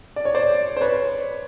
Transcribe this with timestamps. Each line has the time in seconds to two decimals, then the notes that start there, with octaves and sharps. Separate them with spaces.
0.16 D5
0.25 C#5
0.34 C5 D5
0.77 C5
0.81 B4 C#5